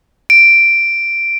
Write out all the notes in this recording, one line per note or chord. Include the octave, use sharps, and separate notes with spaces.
D7